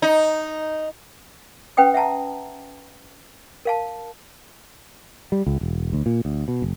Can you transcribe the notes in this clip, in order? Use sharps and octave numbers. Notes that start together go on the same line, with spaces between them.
D#4
C#4 B4 F#5 G5 D#6
E5 F#5 A5 A#5
A#4 F5 A5
G3
C#2
E1
D2
A#2
D2
B2
F#1